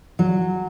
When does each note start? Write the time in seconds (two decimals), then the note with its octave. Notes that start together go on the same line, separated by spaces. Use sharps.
0.19 F#3